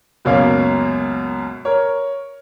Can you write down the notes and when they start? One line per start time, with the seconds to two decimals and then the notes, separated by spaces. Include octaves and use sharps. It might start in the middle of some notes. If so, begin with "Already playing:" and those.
0.25 C#2 F#2 B2 A#3 C#5 F5
1.65 A#4 C#5